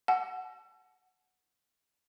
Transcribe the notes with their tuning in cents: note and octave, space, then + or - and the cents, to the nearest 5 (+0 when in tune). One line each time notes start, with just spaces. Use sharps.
F#5 +0 A5 -40 E6 +35